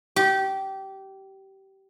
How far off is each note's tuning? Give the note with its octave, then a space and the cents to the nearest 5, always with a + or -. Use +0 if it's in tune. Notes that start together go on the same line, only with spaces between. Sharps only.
G4 -20